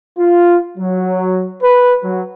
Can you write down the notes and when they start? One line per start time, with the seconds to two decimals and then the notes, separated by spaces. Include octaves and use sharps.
0.18 F4
0.78 F#3
1.63 B4
2.03 F#3